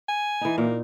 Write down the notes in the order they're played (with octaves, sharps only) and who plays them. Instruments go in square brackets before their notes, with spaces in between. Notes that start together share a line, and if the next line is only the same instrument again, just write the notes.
[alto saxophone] G#5
[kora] E3 D#4
[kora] A#2 [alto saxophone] A#3